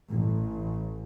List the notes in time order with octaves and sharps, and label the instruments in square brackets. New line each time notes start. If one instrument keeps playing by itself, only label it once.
[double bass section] A1